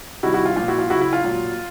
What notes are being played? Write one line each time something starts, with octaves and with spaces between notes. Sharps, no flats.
C3 D#3 G3 E4 F#4
E4 F#4
F4
A#2 F3 F4
E4 F#4
F4
C#3 F#3 E4 F#4
E4
F4
A#2 F#3